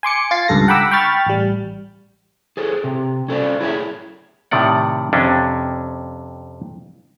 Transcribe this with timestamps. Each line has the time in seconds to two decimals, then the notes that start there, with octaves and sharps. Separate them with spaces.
0.03 G#5 C6 D6 C#7
0.31 F4 A6 C7
0.48 C#2 G2 A4 A#6
0.68 F#5 G5 A#5 B5 D6 E6
0.91 G5 B5 C#6 F6 A6
1.27 A1 G3
2.57 G#4 A4 C5
2.84 C3
3.28 C#4 A4 C5 D5
3.61 E4 G#4 C#5 D#5 E5
4.51 A2 C3 D#3 D5 F#5
5.13 F2 C3 C#4 D4